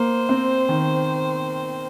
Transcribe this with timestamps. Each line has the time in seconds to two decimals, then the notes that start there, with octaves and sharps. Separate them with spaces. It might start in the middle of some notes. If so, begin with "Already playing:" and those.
Already playing: A#3 C5
0.29 C4
0.69 D#3